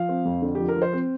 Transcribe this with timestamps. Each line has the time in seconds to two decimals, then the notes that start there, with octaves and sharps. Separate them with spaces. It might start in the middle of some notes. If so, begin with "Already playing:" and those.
Already playing: F3 F5
0.09 C4
0.25 F2
0.42 D3
0.55 F3 G4
0.69 A#4
0.76 F3
0.82 C5
0.93 C4